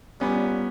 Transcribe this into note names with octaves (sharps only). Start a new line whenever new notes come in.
C2 A#2 G3 B3 C#4